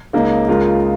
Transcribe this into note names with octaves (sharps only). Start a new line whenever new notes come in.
C#2 C#3 A#3 D#4
C#2 C#3 G#3 F4 A#4